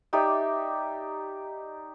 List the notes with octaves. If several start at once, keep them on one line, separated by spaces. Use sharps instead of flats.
D#4 G4 D5 E5